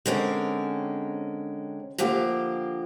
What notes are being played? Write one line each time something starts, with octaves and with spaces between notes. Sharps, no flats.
D3 G#3 C4 C#4 A#4
D3 F3 A#3 G4